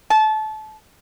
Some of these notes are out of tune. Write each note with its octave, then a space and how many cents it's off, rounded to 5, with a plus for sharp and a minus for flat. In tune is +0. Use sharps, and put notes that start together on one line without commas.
A5 -25